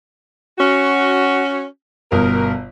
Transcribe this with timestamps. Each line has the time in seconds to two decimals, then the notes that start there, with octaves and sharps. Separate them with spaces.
0.59 C#4 F#4
2.12 G1 B2 A#4